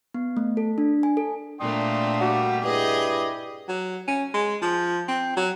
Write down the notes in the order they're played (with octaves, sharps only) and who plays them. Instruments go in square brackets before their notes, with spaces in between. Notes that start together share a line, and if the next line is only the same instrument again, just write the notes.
[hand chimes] B3
A3
A4
D4
G#5
A4
[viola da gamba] A#2 A3 A#3 [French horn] D4 [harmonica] G5 C6 D#6
[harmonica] G3 G4 [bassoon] F#4
[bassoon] G2 [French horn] E4 [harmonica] G4 [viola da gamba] G#4 D#5
[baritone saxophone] F#3
C#4
G#3
F3
C4
F#3